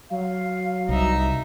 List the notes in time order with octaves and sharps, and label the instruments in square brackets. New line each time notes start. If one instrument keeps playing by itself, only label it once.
[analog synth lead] F#3 [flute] F5
[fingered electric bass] C2 [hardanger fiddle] D#4 E5